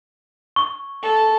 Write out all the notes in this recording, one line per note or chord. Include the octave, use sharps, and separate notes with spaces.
C#6
A4